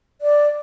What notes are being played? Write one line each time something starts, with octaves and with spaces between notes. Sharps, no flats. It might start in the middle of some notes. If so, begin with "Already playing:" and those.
D5